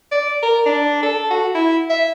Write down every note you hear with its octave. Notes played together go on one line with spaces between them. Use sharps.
D5
A#4
D4
A4
F#4
E4
E5